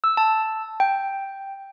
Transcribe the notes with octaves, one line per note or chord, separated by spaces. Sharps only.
E6
A5
G5